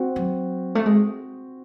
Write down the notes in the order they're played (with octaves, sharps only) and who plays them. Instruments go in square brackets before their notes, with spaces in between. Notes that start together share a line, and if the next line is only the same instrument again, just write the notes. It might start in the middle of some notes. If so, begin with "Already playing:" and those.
Already playing: [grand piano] C4 F#4 C5
[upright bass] F#3
A3
G#3